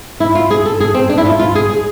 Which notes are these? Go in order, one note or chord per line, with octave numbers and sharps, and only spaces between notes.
E4
F4
G#4
A4
G#4
C4
D4
E4
F4
F4
G#4
G#4